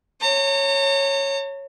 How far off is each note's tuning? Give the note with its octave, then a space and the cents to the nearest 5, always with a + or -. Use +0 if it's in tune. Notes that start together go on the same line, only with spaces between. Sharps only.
C#5 -10 A#5 -45